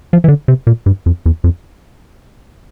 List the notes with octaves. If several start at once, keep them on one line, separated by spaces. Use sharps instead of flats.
F3
E3
D3
C3
A#2
G2
F2
E2
F2